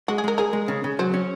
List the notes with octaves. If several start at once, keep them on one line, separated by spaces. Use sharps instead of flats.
G#3 F#4
G#4
G#3 A#4
G#4 A#4
G#3
C#3
C#3
F#3 C5
C#4